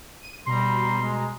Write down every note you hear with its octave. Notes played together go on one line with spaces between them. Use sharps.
D#7
B2 G3 A#5 C6
G#3